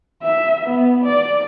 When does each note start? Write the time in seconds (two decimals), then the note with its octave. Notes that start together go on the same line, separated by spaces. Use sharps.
0.22 E5
0.66 B3
1.04 D5